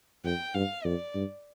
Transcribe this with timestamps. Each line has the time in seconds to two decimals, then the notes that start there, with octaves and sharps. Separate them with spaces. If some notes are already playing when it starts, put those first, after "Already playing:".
0.25 F2 G5
0.54 G2 F5
0.85 F2 D5
1.15 G2